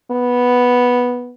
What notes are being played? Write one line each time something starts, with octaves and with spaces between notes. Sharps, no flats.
B3